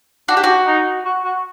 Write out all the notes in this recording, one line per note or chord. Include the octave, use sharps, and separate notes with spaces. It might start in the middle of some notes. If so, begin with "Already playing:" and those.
D4 F#4
G4
F#4
D#4
F#4
F#4